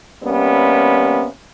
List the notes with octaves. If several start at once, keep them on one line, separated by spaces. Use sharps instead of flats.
C3 G3 A#3 B3 C#4